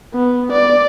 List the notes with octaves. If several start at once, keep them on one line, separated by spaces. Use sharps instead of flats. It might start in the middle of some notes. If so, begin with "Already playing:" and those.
B3
D5